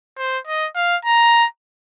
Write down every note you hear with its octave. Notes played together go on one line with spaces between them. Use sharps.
C5
D#5
F5
A#5